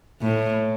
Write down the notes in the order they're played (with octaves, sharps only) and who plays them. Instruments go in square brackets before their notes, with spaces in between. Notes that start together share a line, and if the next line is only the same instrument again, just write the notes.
[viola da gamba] A2